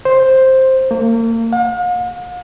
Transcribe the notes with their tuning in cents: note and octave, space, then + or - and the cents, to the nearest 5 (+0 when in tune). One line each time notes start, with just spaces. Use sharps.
C5 +5
A#3 -35
F5 +45